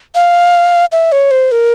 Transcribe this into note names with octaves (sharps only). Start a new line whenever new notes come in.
F5
E5
C#5
C5
A#4